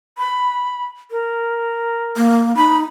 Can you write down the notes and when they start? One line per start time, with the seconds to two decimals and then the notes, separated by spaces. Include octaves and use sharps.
0.18 B5
1.11 A#4
2.16 A#3
2.57 D#4 B5